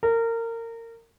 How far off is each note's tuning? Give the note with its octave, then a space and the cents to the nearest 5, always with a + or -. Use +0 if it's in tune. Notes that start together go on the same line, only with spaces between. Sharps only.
A#4 -25